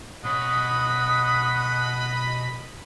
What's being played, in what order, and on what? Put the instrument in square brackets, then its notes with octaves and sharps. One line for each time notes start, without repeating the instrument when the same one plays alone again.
[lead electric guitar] B2 C#5 [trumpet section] D#5 B5 [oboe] F#5 [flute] D#6